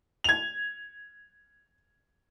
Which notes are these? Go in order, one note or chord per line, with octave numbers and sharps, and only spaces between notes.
G#6 F7